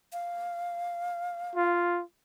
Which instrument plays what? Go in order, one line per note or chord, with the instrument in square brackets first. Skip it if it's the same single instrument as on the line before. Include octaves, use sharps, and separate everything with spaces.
[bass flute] F5
[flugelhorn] F4